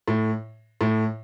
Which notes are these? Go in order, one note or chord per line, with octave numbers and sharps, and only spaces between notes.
A2
A2